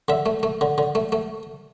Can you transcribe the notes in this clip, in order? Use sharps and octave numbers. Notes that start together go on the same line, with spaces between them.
D3 E5
A3
A3
D3
D3
A3
A3